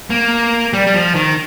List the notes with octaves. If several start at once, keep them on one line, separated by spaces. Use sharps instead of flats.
A#3
G3
G3
F3
D#3